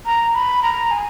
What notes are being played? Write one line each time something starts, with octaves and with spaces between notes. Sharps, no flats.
A#5
B5
A#5
G#5